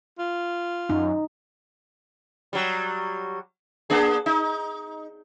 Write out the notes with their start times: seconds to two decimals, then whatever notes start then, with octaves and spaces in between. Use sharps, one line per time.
0.19 F4
0.90 F#2 D#4
2.53 F#3 G3
3.90 A#3 D4 G#4
4.26 D#4